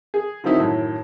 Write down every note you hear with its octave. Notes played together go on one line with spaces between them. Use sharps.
G#4
D3 D#3 F#3 C4 D#4 E4
F#2 A2 D#3